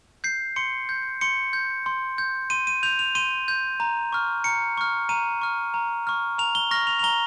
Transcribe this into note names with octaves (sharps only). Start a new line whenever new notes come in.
G6 C7
C6 C#7
G6
C6 C#7
G6
C6
G6
C6 D#7
D#7
G6 F7
F7
C6 D#7
G6
A#5
C#6 F6
A#5 C#7
C#6 F6
A#5 D#7
C#6 F6
A#5
C#6 F6
A#5 F7
G7
C#6 F6 A#6
F7
F7
A#5 G7